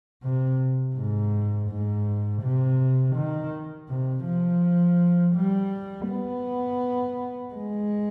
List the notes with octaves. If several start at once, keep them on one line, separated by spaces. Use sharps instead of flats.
C3
G#2
G#2
C3
D#3
C3
F3
G3
B3
G#3